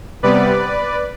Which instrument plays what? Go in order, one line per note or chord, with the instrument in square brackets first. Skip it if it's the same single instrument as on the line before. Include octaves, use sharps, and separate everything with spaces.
[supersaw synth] C3 G3 B3 B4 D5